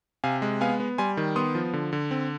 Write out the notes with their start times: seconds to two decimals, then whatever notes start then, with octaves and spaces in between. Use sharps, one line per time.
0.24 C3 F5 G#5
0.42 G#3
0.61 B3 F5 G#5
0.80 B3
0.98 G3 G#5 C6
1.17 D#3
1.36 B3 C6 D#6
1.55 F3
1.73 D3
1.93 D3
2.11 C4